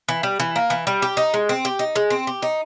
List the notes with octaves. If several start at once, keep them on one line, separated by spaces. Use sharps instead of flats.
E3
G3
E3
A#3
E3
G3
G4
D#4
G#3
C4
G4
D#4
G#3
C4
G4
D#4